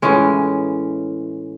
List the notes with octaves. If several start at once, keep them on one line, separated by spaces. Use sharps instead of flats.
A2 E3 G#3 C#4